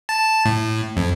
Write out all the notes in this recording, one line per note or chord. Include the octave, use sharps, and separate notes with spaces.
A5
A2
F2